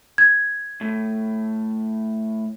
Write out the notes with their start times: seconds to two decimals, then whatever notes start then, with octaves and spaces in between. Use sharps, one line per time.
0.18 G#6
0.81 A2